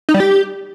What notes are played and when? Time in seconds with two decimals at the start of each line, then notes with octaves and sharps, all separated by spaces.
0.09 D#4
0.14 G3
0.20 G4